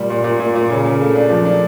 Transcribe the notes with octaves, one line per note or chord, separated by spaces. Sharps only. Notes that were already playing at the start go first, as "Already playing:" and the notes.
Already playing: A#2 G3
A#2
A#2
A#2
A#2
C#3
C#3
A3
D4
F3
D4